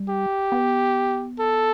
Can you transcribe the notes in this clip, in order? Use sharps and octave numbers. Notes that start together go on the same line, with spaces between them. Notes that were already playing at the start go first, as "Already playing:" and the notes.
Already playing: G3
G4
B3
A4